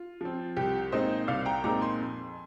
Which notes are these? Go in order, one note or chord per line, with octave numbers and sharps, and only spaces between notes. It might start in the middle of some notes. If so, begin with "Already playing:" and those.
Already playing: F4
F3 C4
C2 G4
A#2 G#3 C4 D#4 C5 D#5
C2 D5 F5
G5 A#5
A#2 G#3 C4 D#4 A#5 D6
G#5 C6
F2